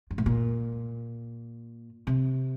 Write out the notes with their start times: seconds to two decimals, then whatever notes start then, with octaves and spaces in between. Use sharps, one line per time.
0.11 G2
0.18 A2
0.26 A#2
2.07 C3